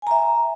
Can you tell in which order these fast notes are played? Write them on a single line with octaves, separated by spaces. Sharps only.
G#5 A#5 E5